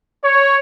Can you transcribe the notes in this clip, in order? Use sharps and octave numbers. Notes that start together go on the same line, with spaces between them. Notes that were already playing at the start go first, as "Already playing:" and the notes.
C#5